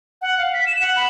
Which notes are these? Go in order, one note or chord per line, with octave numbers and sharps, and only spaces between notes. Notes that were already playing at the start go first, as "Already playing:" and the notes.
F#5
F5
B6
E7
F#5
B5